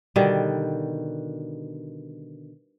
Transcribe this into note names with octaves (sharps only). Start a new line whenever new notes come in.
B2 D3 D#3 G3